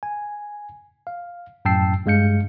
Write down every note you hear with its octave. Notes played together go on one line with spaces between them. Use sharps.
G#5
F5
F#2 A2 G5 A5 E6 C7
G2 G#3 F5 G6 C#7